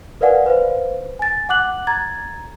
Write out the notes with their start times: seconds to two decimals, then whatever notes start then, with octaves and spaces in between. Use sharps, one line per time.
0.21 A#4 B4 D5 F5 F#5 G#5
0.46 B4 C5 F5
1.19 G#5 A6
1.49 F#5 D6 F#6 F#7
1.87 A#5 G#6 A6